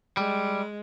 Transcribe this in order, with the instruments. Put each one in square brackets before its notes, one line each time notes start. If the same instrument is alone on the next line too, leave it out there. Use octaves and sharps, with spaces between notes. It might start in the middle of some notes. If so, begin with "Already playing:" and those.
[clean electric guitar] G3 [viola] G#3